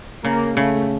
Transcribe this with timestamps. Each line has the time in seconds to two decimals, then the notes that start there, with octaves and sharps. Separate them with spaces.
0.24 C#3 A#3
0.56 C#3 A3